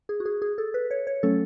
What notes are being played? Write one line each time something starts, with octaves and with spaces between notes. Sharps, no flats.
G#4
F#4
G#4
G#4
A4
B4
C#5
C#5
F#3 A3 C#4 A4